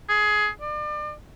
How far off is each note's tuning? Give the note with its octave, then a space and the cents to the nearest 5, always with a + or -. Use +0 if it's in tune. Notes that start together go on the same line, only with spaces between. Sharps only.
G#4 +15
D5 +35